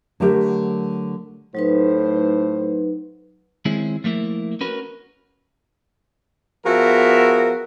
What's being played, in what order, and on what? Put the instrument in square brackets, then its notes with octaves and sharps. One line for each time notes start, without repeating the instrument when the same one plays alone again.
[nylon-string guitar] D3 F#3 A3 G4 A#4
[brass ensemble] A2 C5 [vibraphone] F#3 D#4 B4
[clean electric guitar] D#3 G#3 C4 C#4 E4 G#4
F3 A3 A#3 E4
C#4 F#4 A#4 B4
[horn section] F3 B3 F#4 G#4 A#4 E5